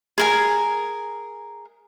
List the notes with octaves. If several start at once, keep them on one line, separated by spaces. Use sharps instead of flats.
G#4 A#4 G#5